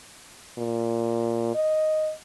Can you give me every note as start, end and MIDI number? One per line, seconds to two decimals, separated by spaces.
0.58 1.55 46
1.55 2.12 75